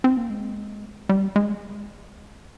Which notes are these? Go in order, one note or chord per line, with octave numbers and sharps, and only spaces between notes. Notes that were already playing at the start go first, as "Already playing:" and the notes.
C4
A#3
G#3
G3
G#3